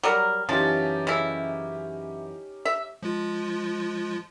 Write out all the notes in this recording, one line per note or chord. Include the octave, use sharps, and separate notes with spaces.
F#3 G3 A#4
F#2 E3 F3 C#4 D#4 G4 A5
C#3 E4
E5
F3 G#3 F4